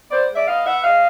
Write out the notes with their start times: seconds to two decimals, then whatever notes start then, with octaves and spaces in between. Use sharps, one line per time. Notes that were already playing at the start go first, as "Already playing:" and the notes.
0.11 B3 C5 D5
0.29 G#3
0.35 D5 E5
0.47 B3 D#5 F5
0.65 B3 E5 F#5
0.84 G#3 D#5 F5